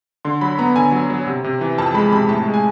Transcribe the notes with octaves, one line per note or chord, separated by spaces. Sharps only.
D3 C6
F#3 B5
B3 A#5
D3 G#5
F#3
F#3
C3
C3
E3
F2 A5
G#3 B5
C3 B5
A2 A5
G#3
G#5